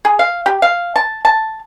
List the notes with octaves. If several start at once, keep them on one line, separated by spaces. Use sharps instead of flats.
G#4
F5
G4
F5
A5
A5